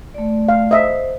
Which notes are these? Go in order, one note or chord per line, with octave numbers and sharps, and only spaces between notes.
A3 D5
F5
C5 D#5 E5